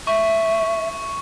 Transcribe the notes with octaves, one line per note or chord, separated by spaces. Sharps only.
E5 C#6